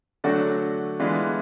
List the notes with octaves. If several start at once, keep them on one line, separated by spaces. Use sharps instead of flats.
D3 F#3 A3 D4 F#4
E3 G#3 B3 D4 F4